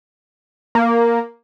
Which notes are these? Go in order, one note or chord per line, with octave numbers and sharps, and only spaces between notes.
A#3